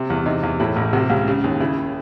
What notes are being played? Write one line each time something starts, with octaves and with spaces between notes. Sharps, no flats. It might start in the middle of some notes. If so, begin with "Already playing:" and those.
Already playing: C3
E2
C3 D#4
E2
A2 E4
A1
C3 F#4
C#2
C#3
D#2
C#3 E4